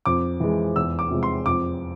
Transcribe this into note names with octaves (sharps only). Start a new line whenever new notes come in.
F2 D6
E3 G#3
E2 E6
D6
C3 F3 G#3
C6
F2 D6